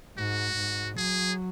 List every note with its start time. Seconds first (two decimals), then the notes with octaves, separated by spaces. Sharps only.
0.17 G#2 F#4
0.56 G#2
0.96 F#3 G#4